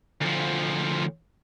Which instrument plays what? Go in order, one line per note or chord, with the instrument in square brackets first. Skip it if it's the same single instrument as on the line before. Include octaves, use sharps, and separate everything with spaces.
[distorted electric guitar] D2 F3